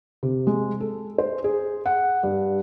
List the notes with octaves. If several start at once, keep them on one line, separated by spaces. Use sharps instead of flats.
C3
G#3
A4
C5
G#4
F#5
G2